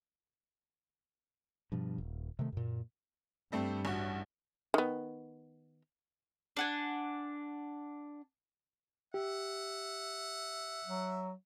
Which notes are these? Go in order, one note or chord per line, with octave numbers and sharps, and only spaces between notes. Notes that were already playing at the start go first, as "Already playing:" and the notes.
G2 B2 F3
D#1
C3 D#3 A3
F#2 A#2
G2 G3 A3 C4
A1 F#4
D#3 B3
D4 F#5 G#5
G4 E5 F#5
F#3